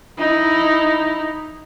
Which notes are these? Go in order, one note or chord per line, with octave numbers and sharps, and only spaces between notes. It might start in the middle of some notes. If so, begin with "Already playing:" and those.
D#4 E4